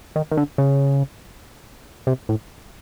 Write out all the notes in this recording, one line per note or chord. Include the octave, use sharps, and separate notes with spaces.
D#3
D#3
D3
C#3
C3
A2